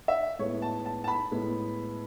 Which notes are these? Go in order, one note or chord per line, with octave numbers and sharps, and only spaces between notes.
E5
A2 G#3 B3 C#5
A5
A5
A5
B5
A2 G#3 B3